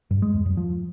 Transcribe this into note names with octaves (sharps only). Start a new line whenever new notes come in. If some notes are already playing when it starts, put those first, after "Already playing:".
G2
G#3
E2
F#2
F3